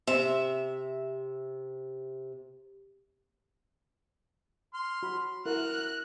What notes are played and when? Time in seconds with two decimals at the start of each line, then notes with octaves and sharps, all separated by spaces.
0.07 C3 E5
4.74 C6 F6
5.03 F#4 B5
5.45 E4 F#4 A#4 F6 F#6